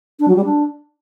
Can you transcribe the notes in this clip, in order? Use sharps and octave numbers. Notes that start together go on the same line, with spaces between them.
D4
F#3
G3
D4